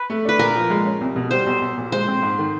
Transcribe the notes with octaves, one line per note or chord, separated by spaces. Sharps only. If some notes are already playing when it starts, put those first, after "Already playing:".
Already playing: B4
A3
D4 B4
A#2 A#4
F3
G#3
C#4
C2
B2
G3 C5
B1
B1
A#2
G#3 C5
C4
G#2
D#3